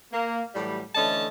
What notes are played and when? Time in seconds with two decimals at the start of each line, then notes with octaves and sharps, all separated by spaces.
0.11 A#3
0.55 A2 E3 F#3 G3
0.95 D3 E3 A3 C#4 D#5 A5